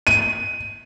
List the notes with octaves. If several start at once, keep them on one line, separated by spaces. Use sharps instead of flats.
D#7